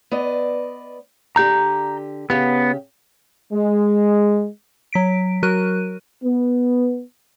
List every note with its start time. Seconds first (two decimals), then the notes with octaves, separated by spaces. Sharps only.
0.11 B3 D5 D#5
1.36 D3 G4 A#5 G6
2.30 C#3 B3 G4
3.52 G#3
4.93 F#3 B6 D7
5.43 F#3 F#4 A#4 F#6 D#7
6.24 B3